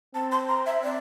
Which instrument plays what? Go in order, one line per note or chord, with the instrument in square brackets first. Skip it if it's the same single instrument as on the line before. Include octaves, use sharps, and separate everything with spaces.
[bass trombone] C4 [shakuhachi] A5
[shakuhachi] C6
A#5
E5
D5